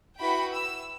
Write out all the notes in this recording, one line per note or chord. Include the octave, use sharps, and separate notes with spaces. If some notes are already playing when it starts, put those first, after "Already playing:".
E4 F#4 B4 G5 B5
E6